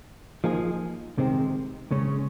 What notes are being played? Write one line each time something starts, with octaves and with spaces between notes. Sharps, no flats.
F3 A#3 D#4 G#4
C2 C3 D#3 G#3 C4
C#3 G#3 C#4